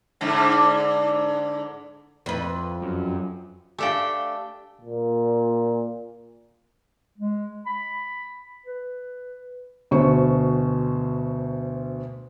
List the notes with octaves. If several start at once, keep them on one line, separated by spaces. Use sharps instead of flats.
G#2 D3
F2 B4
F#2
A3 D4 G4 A4 F5 G5 G#5
A#2
G#3
B5
B4
D2 B2 C5 C#6